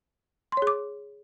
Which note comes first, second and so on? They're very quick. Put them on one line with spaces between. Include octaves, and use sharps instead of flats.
C6 C#5 G#4 D6